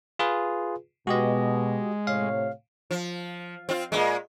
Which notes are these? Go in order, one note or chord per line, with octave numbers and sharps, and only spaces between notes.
F4 G#4 B4
B2 G#3 F#4 G4 D#5
A2 C3 C#5 F5
F3
C4 F4
A#2 C#3 G#3